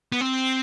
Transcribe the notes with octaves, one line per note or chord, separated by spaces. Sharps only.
B3
C4